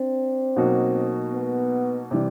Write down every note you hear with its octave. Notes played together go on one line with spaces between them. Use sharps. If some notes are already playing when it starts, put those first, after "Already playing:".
Already playing: C4 D4
B2 F#3 A#3 D#4 F#4
B3
C3 E3 G3